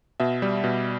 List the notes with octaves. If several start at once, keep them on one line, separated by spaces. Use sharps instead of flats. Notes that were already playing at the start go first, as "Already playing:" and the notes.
B2 E5
G3
B2